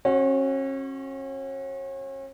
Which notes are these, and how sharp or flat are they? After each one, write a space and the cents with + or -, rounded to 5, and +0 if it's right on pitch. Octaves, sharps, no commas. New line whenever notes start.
C#4 -40 F#4 +0